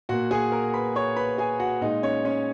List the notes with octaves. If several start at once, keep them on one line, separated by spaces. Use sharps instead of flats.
A#2 A#3 F#4 F#5
G#4 G#5
A#4 A#5
B4 B5
C#5 C#6
B4 B5
G#4 G#5
F#4 F#5
A#2 G#3 D#4 D#5
C#4 C#5
C#4 C#5